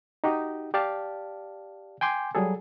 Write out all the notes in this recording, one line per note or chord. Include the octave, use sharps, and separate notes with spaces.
D#4 F#4 G4
G4 D5 F5 A5
G5 G#5 C6 D6 G6
F#3 G3 G#4 A4